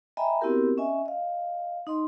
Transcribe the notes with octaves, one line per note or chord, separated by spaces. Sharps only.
D#5 E5 G5 G#5 A#5 B5
B3 C4 E4 F#4 G4 A#4
C#4 D#5 E5 G#5
D#5 F5
D#4 D#5 C6